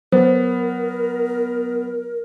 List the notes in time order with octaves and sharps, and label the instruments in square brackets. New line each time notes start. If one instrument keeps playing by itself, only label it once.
[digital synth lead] F#3 [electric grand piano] B3 [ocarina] A#4 [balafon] C5